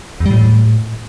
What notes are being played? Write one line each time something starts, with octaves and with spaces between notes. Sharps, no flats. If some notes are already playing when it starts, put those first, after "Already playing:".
E2
G3
A2